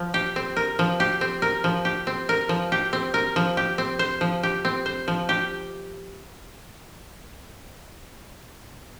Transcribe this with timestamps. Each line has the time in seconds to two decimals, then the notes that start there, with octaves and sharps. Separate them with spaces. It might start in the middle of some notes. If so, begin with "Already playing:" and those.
Already playing: F3
0.14 G4
0.36 C4
0.56 A#4
0.79 F3
1.00 G4
1.21 C4
1.42 A#4
1.64 F3
1.85 G4
2.07 C4
2.29 A#4
2.49 F3
2.72 G4
2.93 C4
3.14 A#4
3.36 F3
3.57 G4
3.78 C4
3.99 C5
4.21 F3
4.43 G4
4.65 C4
4.86 C5
5.08 F3
5.29 G4